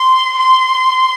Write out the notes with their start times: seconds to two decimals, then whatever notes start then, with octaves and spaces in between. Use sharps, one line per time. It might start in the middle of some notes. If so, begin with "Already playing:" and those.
Already playing: C6
0.38 C6